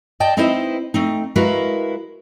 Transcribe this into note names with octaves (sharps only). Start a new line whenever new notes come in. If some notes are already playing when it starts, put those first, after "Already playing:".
D5 D#5 G5 A5
C4 D#4 E4 B4 C5 D#5
A3 C4 D#4
G#3 E4 F#4 A#4 B4 F5